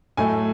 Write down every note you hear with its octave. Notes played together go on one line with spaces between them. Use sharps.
A2 F#3 A3 G#5